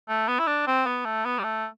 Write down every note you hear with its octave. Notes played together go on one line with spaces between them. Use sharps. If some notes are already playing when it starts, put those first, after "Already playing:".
A3
B3
E4
D4
C4
B3
A3
B3
G3
A3